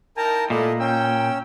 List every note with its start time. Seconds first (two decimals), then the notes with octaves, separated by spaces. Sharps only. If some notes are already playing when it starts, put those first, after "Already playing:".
0.17 D#4 E4 A#4 G5 A5 A#5
0.50 A#2 A3 E4 D5 D#5
0.80 C#4 G5 E6